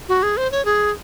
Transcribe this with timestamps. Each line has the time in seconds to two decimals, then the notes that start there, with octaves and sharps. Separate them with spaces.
0.09 F#4
0.23 G#4
0.37 C5
0.52 C#5
0.65 G#4